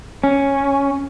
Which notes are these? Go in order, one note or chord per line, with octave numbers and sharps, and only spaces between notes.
C#4